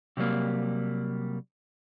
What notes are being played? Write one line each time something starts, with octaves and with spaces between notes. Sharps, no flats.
C3 F#3 G3 A#3